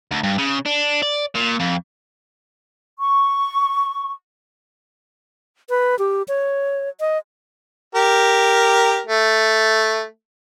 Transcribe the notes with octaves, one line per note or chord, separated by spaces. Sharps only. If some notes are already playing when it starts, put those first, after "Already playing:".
D2
G2
C#3
D4
D5
A#2
F2
C#6
B4
G4
C#5
D#5
G4 A#4
A3